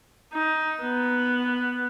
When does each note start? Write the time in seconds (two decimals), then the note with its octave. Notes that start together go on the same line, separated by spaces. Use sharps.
0.34 D#4
0.82 B3